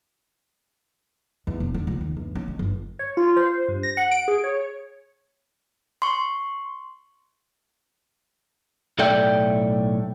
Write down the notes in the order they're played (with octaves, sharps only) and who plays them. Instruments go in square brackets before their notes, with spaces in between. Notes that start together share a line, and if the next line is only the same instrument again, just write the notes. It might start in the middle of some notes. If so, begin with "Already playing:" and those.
[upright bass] E2
E1
D3
C#2
D#2
G1
C#4
G#3
G1
[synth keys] C#5
F4
C5
G2
A#6
F#5
D7
G#4
C#5
[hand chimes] C6 C#6
[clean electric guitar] B1 A2 A4 D5 E5 G5